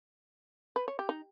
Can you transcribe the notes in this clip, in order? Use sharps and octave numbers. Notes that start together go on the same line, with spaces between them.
B4
C#5
G4
D#4